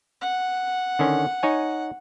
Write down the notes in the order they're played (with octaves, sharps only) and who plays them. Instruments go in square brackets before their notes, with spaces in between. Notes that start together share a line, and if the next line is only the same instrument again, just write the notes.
[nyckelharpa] F#5
[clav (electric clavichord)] D3 D#3 C#4
D#4 C#5 G#5